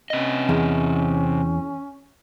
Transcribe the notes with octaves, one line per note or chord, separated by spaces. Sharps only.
C3 C#4 D#5
E2